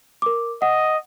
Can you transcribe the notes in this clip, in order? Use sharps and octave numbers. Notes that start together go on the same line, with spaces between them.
A#4 D6
D#5 F#5